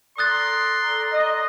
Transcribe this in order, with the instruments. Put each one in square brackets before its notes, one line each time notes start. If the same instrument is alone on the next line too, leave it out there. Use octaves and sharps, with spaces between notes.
[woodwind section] A4 D5 A#5 [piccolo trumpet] C6 [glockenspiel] D#6 F#6 A6
[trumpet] D#5